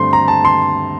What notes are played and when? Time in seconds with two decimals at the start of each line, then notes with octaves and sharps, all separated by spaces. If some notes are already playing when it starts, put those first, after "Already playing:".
Already playing: G2 D3 A3 C4 C6
0.13 A#5
0.28 A5
0.45 C6